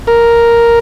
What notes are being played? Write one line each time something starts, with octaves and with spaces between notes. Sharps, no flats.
A#4